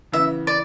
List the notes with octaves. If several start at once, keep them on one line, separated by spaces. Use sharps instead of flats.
C#3 E3 B3 E5
D5